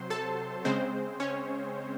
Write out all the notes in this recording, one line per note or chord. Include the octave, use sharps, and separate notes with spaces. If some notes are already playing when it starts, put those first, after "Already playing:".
Already playing: C3 F#3 C5 C6
A4 A5
C#3 G#3 C4 C5
C#4 C#5